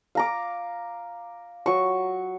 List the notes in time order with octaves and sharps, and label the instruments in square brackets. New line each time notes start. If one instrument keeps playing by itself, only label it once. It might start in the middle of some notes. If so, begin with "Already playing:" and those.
[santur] F5 A#5 D6
F#3 C#6